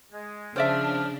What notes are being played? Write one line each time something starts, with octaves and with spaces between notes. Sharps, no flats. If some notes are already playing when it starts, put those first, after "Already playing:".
G#3
C#3 F3 D4 C5 D5 E5 F6